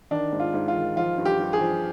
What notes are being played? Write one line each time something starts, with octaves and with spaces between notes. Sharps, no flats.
D#3 D4
G#2
F4
G#2
F4
D#3
F3 F4
G2
G4
G2
G#4
F3